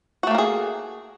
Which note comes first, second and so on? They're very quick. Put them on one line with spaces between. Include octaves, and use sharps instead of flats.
F#4 A3 A#3 A#4 G#4